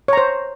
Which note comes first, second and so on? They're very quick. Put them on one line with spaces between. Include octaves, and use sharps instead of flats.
C#5 A#5 C5